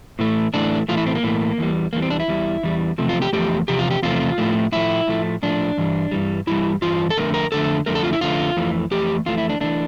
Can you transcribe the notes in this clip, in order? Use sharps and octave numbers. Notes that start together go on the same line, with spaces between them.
A2 E3 A3
A2 E3 A3 D4
A2 E3 A3 F4
E4
C4
A#3
A2 E3 A3
E2 E3 G3
E2 E3 G3 A#3
C4
D4
E4
E2 E3 G3
E2 E3 G3
E2 C3 F3 A3
F4
G4
E2 C3 F3 A3 G4
E2 C3 F3 G4
F4
G4
E2 C3 F3 A3 F4
A2 F3 A3
A2 F3 A3 E4
A2 F3 A3
A2 F3 A3 D4
G2 E3 G3
G2 E3 G3
G2 E3 G3 E4
G2 E3 F4
A4
F2 D3 A3 A#4
A#4
F2 D3 A3 A4
F2 D3 A3 A#4
A4
F4
E4
F2 D3 A3 F4
F2 E3 A3
F2 E3 A3 G4
F2 E3 A3 F4
E4
D4
E3 A3 D4